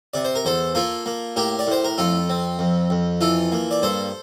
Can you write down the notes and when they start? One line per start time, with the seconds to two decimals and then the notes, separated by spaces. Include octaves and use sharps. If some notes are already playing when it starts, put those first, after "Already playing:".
0.14 C3 D5
0.25 C5
0.35 A#4
0.45 E2 A4 C5
0.75 A#3 F4 A4
1.06 A#3
1.36 A2 G4 A#4
1.59 D5
1.67 A2 C5
1.84 A#4
1.98 F2 F4 A4
2.29 C4
2.59 F2
2.90 F2
3.21 E3 F4 A4
3.52 A#3
3.71 D5
3.82 G2 A4 C5